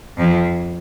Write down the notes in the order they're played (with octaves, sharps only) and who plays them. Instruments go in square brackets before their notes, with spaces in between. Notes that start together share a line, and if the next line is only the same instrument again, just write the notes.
[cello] F2